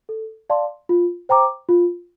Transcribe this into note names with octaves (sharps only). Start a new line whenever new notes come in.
A4
D5 F5 A5 C6
F4
C5 G5 A#5 D6
F4